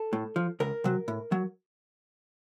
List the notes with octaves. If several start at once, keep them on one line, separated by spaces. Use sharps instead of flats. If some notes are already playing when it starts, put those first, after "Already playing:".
Already playing: A4
A2
F3
C#2 A#4
C3 F#3
A2
F#3